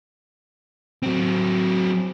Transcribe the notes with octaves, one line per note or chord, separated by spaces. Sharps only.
F#3 C4